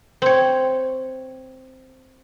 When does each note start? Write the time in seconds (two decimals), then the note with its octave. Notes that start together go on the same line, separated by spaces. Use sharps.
0.22 C4 C#5